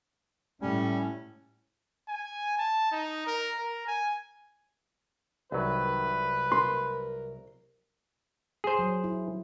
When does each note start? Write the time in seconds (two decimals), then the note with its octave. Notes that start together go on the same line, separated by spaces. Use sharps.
0.61 A2 G3 A3 C#4
2.09 G#5
2.58 A5
2.92 D#4
3.27 A#4
3.58 A#4
3.87 G#5
5.52 C2 D#3 F#3 B4
6.52 A#4 C6
8.64 G#4 C5
8.79 F#3
9.04 E4